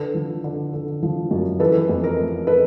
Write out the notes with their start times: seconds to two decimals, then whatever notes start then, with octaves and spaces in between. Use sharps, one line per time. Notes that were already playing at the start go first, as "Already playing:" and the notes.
Already playing: D3 A4 B4
0.14 F3
0.44 D3
0.73 D3
1.03 F3
1.31 F#2
1.60 E3 A4 B4
1.89 F2
2.04 A#4
2.18 A3
2.47 A4 B4